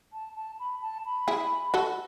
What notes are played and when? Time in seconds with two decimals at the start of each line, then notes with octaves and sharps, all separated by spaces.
0.13 A5
0.36 A5
0.60 B5
0.82 A5
1.06 B5
1.28 E4 G#4
1.74 F#4 A4